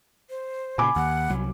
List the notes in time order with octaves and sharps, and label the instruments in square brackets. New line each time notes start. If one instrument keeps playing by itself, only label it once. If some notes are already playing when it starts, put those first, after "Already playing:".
[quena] C5
[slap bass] A#2 C#3 [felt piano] G#5 B5 D6
[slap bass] D#2 [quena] F#5
[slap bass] C2 F#3